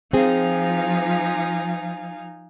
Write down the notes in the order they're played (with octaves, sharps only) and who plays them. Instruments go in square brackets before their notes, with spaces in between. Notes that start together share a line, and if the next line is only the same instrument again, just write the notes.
[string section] F3 [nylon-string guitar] C4 G#4 [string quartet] D#4 F5 G#5